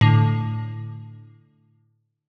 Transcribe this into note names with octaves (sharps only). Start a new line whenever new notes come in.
A2 D3